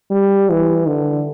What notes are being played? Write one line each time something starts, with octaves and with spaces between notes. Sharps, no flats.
G3
E3
D3